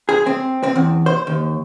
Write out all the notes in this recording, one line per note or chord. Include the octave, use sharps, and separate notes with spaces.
G#4
C4
C4
E2
C5
D#2